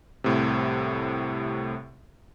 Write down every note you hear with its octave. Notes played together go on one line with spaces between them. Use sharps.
C2 A2 C3